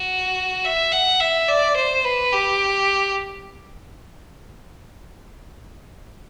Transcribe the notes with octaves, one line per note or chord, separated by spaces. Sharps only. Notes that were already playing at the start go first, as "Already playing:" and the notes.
Already playing: F#4
E5
F#5
E5
D5
C5
B4
G4